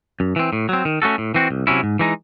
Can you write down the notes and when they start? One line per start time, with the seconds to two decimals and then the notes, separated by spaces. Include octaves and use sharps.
0.20 F#2
0.36 E3 C4
0.53 A2
0.69 F#3 C4
0.85 D#3
1.02 A3 C#4 F#4 A4
1.18 A2
1.34 E3 C4 F#4
1.51 C2
1.67 C3 F#3 C#4 E4
1.83 G#2
1.99 E3 G#3 D#4